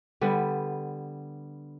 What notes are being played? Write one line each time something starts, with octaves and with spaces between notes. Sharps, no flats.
D3 G3 B3